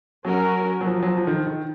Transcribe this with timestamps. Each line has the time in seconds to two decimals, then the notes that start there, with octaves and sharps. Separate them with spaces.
0.24 F#3 C#4 F#4 A#4
0.81 F#3
0.86 F3
1.03 F#3
1.07 F3
1.17 F3
1.27 D#3
1.47 D#3